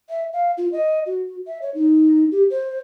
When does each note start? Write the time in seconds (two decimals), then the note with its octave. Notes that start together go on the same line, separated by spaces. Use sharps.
0.10 E5
0.33 F5
0.57 F4
0.72 D#5
1.06 F#4
1.47 E5
1.62 C#5
1.74 D#4
2.32 G4
2.50 C5